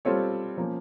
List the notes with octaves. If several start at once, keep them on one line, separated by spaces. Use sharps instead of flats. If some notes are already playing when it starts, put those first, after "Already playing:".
G3 C4 F4 A4 C#5
F3 A#3 C#4